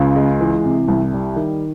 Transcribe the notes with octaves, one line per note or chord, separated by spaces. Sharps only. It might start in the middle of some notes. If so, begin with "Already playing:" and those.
Already playing: C#2 C#3
G#3
E3
C3
C2
G3
D#3